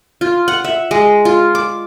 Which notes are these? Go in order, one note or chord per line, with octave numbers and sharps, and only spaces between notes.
F4
F#5
E5
G#3
F4
D6